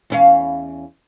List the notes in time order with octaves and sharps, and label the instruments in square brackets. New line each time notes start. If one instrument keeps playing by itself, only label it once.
[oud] E2 C#4 F5